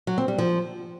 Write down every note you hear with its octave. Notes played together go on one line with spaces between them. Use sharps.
F#3
C4
G3
F3